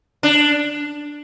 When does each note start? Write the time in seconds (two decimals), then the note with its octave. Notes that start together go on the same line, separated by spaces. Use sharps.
0.23 D4